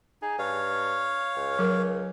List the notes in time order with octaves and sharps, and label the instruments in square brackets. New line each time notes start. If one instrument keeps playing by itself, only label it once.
[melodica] D#4 [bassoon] G#4
[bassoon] G2 [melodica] C#5 F5
[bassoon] C#2
[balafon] F#3 A#4